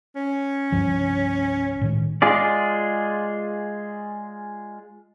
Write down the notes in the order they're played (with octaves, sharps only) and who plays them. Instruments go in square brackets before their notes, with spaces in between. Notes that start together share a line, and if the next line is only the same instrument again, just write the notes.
[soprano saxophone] C#4
[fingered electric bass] C2 G2 F3
A2 D#3 G#3
[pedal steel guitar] G#3 F4 G#4 D5